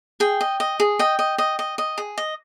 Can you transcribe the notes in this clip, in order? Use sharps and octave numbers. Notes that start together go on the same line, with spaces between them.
G#4 G5
D#5
D#5
G#4
D#5 G5
D#5
D#5
D#5
D#5
G#4
D#5